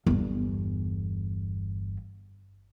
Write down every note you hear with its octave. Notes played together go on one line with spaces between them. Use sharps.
G1 E2